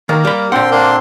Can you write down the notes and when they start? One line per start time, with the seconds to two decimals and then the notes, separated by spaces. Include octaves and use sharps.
0.09 D#3 A#3 A#4
0.25 G3 B5
0.52 A#2 D3 C4 F#5 G5 C6
0.72 A#3 D4 C6